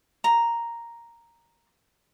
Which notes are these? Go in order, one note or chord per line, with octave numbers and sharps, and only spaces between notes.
A#5